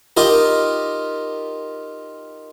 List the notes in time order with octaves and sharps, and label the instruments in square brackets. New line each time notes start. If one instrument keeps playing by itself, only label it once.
[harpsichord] D#4 F4 G4 A#4